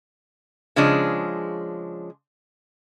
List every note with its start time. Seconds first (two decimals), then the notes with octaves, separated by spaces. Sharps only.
0.76 C#3 F3 G#3 C#4 D4